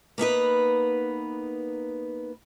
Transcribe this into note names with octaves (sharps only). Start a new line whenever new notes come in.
A#3 B3 D#4 B4